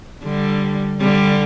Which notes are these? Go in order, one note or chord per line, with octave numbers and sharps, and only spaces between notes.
D3 G3
D3 G3